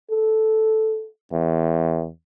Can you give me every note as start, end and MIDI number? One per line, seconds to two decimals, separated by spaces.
0.10 1.07 69
1.32 2.09 40